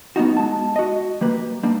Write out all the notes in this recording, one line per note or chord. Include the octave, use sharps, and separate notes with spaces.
G3 B3 C#4 D#4 F#4
G#3 A5
F#4 D#5
G3 A#3 B4
G3 A#3 D4